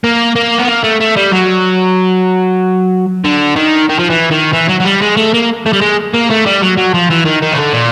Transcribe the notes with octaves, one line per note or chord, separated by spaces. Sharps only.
A#3
A#3
B3
A#3
A3
A3
G3
F#3
D3
D#3
D#3
F3
E3
D#3
E3
F#3
F#3
G3
G#3
A3
A#3
A3
G3
G#3
A#3
A3
G3
F#3
F#3
F3
E3
D#3
D#3
C#3
D3
A#2